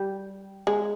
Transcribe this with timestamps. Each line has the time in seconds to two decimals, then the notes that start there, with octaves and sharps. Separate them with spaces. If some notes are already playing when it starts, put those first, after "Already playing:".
Already playing: G3
0.67 G#3